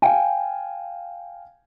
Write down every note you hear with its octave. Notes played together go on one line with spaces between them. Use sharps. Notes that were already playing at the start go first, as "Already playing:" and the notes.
F5 G5 G#5